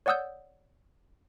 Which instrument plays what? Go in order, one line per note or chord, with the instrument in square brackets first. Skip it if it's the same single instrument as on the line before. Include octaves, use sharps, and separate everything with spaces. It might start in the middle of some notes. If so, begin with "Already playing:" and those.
[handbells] C#5 D5 F#5 D#6 E6 G6